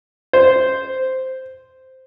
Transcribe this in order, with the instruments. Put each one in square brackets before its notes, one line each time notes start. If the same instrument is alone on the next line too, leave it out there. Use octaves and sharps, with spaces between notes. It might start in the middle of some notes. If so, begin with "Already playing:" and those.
[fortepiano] C5